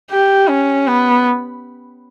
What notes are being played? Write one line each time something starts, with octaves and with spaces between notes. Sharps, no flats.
G4
C#4
B3